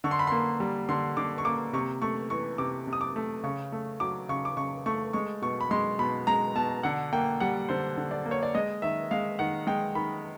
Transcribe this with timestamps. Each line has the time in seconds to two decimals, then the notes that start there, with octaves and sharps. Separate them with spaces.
0.04 D3 C#6
0.11 C6
0.19 B5
0.27 A#3 C6
0.60 G3
0.89 D3 C6
1.17 D3 D6
1.38 C#6
1.45 A#3 D6
1.73 C3 C#6
2.02 A3 C#6
2.30 E3 C#6
2.58 C3 D6
2.87 C3
2.93 D#6
3.01 D6
3.16 A3
3.44 C#3 C#6
3.72 A3
4.00 F#3 D6
4.29 C#3 C#6
4.45 D6
4.57 C#3 C#6
4.86 A3 C#6
5.13 G#3 C#6
5.42 B2 C#6
5.61 B5
5.71 G#3 C6
5.99 B2 B5
6.27 G#3 A#5
6.55 B2 A5
6.83 D3 F#5
7.13 A#3 G5
7.40 G3 F#5
7.68 D3 C5
7.97 D3
8.11 D5
8.26 A#3
8.31 C#5
8.43 D5
8.55 G#3 D#5
8.82 D#3 E5
9.11 G#3 F5
9.39 D#3 F#5
9.67 G#3 G5
9.95 D#3 B5